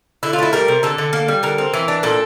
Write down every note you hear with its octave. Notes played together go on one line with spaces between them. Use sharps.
D3 E4
F4
A3 E4
G3 A#4
C3
D3 A4
D3
A#3
G3
D3 A#4
C4
E3
D4
A#2 A4